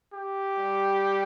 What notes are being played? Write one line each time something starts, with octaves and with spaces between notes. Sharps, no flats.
G4
G3